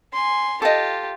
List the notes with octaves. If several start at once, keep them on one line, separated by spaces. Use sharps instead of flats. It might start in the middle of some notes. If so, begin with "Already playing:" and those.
G#5 C6
F4 G4 A4 D#5